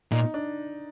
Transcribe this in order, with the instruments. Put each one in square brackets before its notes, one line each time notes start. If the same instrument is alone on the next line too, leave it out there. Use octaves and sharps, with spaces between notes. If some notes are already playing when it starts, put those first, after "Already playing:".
[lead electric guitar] A#2 [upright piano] D#4
[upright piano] D4